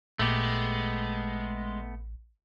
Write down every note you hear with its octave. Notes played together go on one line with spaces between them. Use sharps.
A1 A#2 G#3 A3 B3 G4